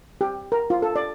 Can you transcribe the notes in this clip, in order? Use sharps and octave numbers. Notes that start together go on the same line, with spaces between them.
G4
A#4
F4
A4
D5